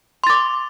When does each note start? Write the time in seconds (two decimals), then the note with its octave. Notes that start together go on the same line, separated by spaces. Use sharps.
0.24 C6
0.27 A6
0.30 D6